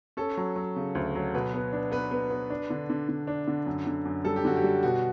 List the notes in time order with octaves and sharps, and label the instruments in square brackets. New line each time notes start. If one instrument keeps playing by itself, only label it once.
[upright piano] C#4 [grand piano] A4
[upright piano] F#3
F#3
C#3
D2
F#3
[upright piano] B2 [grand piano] B4
[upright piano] B3
D4
[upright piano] B3 [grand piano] B4
[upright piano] B3
B3
D4
D3
D3
D3
D4
D3
F#2
D3
F#2
[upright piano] G3 [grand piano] A4
[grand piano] G4
[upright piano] D3 [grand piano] F#4
[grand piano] G4
[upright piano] G3
[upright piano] B2 [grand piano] F#4